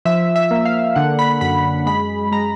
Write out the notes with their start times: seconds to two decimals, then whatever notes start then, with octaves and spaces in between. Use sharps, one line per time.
0.05 F3 E5
0.36 E5
0.51 A#3
0.65 F5
0.96 D3 F#5
1.19 B5
1.41 F#2 B5
1.86 G#3 B5
2.32 G#3 A#5